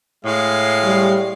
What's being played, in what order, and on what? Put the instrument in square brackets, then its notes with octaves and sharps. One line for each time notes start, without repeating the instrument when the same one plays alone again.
[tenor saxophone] A2 [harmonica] G#3 F5
[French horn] G3